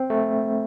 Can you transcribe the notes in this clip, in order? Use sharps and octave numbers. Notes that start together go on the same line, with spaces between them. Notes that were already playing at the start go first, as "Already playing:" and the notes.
Already playing: C4
A3